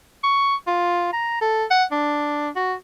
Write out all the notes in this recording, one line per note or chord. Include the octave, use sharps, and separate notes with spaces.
C#6
F4
A#5
A4
F#5
D4
F#4